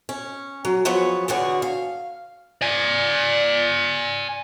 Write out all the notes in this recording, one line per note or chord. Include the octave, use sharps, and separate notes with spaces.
C#4
F#3
F3 F#3 B3 G#4 C#5
E2 D3 B3 F#4 G#4 C#5
F5
D5 G#5